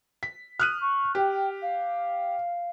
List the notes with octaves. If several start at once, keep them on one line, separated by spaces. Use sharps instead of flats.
B6
D#6 F6 F#6 D#7
C#6
G4 G5
F5